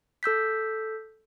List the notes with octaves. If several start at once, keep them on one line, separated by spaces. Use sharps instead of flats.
A4 E6 G6 B6